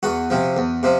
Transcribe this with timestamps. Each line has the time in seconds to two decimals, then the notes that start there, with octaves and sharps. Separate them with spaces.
0.03 E2 F#4
0.30 C3 F3
0.57 E2
0.83 C3 F3